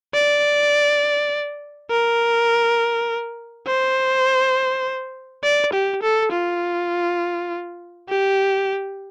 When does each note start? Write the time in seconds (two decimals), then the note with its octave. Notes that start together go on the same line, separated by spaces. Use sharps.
0.14 D5
1.91 A#4
3.67 C5
5.44 D5
5.73 G4
6.03 A4
6.32 F4
8.09 G4